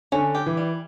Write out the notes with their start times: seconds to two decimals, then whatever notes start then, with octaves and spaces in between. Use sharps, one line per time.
0.12 D3 C#4
0.35 G4
0.46 E3
0.57 G3